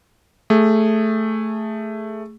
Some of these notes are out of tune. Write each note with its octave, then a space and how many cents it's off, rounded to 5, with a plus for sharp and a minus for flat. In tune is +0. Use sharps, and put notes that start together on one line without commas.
A3 +0 G#4 -10